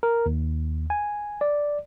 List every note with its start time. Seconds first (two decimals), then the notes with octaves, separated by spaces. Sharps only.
0.03 A#4
0.26 D#2
0.90 G#5
1.41 D5